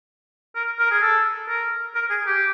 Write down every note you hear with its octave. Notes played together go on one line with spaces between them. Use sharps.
A#4
A#4
G#4
A4
A#4
A#4
G#4
G4